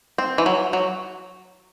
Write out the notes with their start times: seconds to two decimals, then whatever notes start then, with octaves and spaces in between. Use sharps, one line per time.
0.18 C4
0.38 E3
0.46 F#3
0.73 F#3